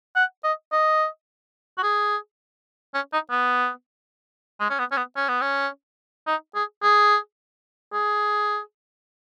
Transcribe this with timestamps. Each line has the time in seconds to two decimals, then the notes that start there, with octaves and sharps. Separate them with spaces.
0.16 F#5
0.44 D#5
0.72 D#5
1.78 F#4
1.83 G#4
2.94 C#4
3.13 D#4
3.31 B3
4.60 G#3
4.70 C#4
4.79 B3
4.92 C#4
4.97 B3
5.16 C#4
5.29 B3
5.42 C#4
6.27 D#4
6.55 G#4
6.83 G#4
7.93 G#4